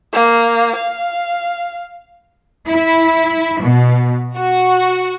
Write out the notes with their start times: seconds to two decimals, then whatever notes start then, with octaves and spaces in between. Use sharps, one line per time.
0.13 A#3
0.76 F5
2.68 E4
3.61 B2
4.35 F#4